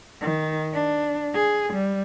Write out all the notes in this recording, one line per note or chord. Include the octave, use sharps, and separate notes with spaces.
D#3
D4
G#4
G3